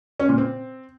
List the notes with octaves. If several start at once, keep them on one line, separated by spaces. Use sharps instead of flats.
C#4
A#2
C4